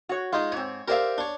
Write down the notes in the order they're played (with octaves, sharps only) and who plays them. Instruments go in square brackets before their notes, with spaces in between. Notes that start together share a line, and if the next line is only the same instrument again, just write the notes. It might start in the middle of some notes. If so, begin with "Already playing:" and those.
[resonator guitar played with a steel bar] F#4 C#5
[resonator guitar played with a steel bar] G#3 [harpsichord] D#4 F4
[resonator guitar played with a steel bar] G#2 C4 [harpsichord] C#5
[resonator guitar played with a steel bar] G4 C5 F5 [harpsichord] A#4 D5 E5
[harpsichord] D4 C#5